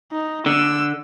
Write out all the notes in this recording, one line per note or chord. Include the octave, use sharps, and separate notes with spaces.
D#4
D3 E6